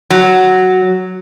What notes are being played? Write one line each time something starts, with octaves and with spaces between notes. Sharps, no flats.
F#3